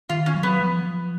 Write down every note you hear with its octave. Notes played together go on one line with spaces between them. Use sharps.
D#3 F4
C#4
F#3
B3
F3